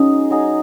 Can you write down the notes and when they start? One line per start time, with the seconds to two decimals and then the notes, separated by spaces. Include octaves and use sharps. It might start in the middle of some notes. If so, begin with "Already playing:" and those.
Already playing: F#3 C#4 D#4 G#4
0.30 F#3 D#4 G#4